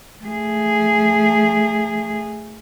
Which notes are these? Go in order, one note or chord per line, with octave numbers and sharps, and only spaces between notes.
A3 G#4